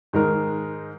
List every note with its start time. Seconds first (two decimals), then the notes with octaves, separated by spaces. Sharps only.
0.13 G#2 D#3 G#3 D#4 A#4